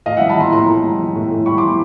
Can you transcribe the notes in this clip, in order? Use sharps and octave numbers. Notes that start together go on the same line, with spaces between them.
A2 D#5 F5
E5 F#5
G3
A5 B5
E3 A#5 C6
A2 A#5 C6
A2
G3
E3
A2
A2
G3 B5 C#6
C6 D6
E3